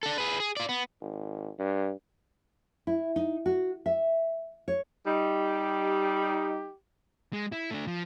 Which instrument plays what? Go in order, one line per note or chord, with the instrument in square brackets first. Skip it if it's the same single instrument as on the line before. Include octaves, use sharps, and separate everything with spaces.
[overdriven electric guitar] D4 A4
G#4 B4
G#4
F4 D5
B3
[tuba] G#1
G2
[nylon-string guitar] E4
D#4
F#4
E5
C#5
[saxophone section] G3 D#4 [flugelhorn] G4
[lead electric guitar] G#3
E4
A3 D4
F3